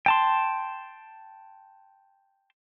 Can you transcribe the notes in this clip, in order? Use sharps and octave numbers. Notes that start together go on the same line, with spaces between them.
G5 A5 C6